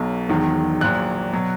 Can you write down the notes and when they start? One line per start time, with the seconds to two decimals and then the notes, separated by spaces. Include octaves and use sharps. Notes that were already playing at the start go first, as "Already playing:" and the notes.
Already playing: B1 B2 F#3
0.28 E1 E2 D#3 F#3
0.81 A#1 A#2 F#3 F#6
1.33 B2 F#3